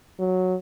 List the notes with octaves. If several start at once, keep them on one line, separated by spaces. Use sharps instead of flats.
F#3